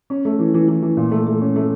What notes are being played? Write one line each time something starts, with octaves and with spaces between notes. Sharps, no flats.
C#4
A3
E3
E3
E3
E3
A#2
A3
A3
C#4
A3